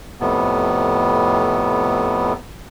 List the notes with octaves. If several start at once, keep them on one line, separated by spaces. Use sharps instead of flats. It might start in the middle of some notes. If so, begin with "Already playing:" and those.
F2 A2 C3 B3